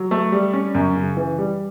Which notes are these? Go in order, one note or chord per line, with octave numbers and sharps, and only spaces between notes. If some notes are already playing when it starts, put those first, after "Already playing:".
Already playing: F#3
A3
G3
C#4
F#2
C#3
E3
G3